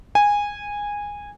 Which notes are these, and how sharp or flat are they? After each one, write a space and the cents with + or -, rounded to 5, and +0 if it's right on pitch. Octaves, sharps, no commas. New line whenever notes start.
G#5 -15